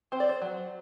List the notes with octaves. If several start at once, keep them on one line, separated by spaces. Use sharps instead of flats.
C4 C5
D5
C5
F#3